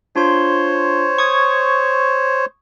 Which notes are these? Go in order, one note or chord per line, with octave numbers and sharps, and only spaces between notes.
D4 F4 C5 C#5 C6
C#6 D#6 G#6